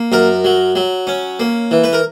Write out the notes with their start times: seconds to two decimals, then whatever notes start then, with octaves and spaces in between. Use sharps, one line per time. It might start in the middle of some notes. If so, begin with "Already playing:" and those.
Already playing: A#3
0.12 F#2 A#4
0.45 F#3
0.75 F#3
1.07 C#4
1.40 A#3
1.71 E3
1.84 B4
1.93 A#4